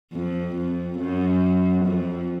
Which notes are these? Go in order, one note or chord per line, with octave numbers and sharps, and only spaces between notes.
F2
F2
F#2
F2